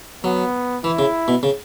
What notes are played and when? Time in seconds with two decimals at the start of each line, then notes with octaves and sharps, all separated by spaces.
0.24 F#3 B3
0.84 E3 E4
0.99 C#3
1.28 B2
1.43 C#3